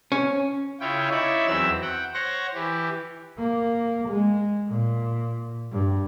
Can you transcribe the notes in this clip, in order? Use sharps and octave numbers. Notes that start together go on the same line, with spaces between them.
C#4
C#3 E4 F4 C#5 G5
D#4 E4 C#5 D5 E5
E2 F#3 C4 E5 E6
F#5 G5
C5 C#5 F#5 C#6 A#6
E3 G4
A#3
G#3
A#2
G2